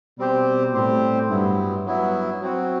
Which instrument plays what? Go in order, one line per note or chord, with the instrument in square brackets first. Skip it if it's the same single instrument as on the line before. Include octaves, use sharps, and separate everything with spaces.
[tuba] B2 [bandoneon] G3 C4 G4 C5
[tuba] A2 [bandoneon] G3 C4 G4 C5
[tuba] G2 [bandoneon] F#3 B3 E4
[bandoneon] F#3 B3 E4
F#3 C4 F#4